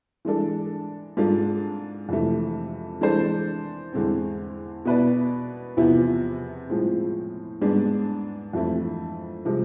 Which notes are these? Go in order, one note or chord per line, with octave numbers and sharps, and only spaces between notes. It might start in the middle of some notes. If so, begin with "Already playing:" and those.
E3 G#3 D4 A4
G#2 G#3 D4 F4 A4
F2 C3 E3 A3
E3 G#3 D4 A4 C5
E2 D3 G#3 C4
B2 B3 E4 B4 D5
E2 C3 F3 B3 E4
A2 F3 G#3 C4
G#2 G#3 B3 D4 G#4
F2 E3 A3 C4 E4
C3 F3 G#3